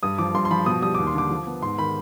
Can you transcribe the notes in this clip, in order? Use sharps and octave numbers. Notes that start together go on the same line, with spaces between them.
G2 D#6
F3 D6
G2 C6
C6
F3 B5
B2 D#6
G3 D#6
D#2 D6
C6
D3 D6
F3
B3
G#2 C6
D#3 B5